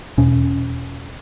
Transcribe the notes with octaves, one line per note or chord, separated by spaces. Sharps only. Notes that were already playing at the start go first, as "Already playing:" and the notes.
E2 B2 C#4